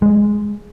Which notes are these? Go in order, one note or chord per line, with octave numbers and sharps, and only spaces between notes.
G#3